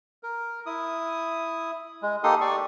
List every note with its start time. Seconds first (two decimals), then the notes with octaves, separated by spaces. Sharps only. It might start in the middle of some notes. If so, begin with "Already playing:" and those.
0.23 A#4
0.66 E4 D#6
2.02 G#3
2.23 A#3 D#4 G4 A4 C6 D#6
2.41 G4 D5 C#6